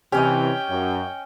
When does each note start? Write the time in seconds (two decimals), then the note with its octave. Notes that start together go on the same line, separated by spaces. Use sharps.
0.12 C3 E3 C#4 G4 C#5 D#5 G5
0.69 F#2